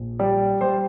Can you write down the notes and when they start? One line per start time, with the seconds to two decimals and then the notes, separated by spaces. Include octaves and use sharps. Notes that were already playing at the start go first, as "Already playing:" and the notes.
Already playing: A#1
0.19 G3 D5
0.61 G3 C5